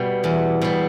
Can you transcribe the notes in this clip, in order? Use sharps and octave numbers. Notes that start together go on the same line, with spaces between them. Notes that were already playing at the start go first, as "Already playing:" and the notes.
Already playing: B2 G3
E2
B2 G3